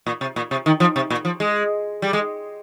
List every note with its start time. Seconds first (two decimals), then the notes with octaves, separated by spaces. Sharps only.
0.06 A#2
0.21 C3
0.36 A#2
0.51 C3
0.66 D#3
0.80 F3
0.96 C3
1.10 A#2
1.25 F3
1.40 G#3
2.02 G3
2.13 G#3